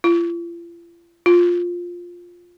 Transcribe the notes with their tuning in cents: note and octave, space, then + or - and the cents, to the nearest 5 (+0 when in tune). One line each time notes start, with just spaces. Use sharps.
F4 -45
F4 +5